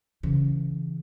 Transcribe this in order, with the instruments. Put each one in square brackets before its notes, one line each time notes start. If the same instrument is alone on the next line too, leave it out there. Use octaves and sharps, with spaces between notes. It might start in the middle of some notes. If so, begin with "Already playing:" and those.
[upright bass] C#3 E3